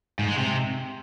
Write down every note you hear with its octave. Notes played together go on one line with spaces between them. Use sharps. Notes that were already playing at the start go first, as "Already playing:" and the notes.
G#2
G#3
C3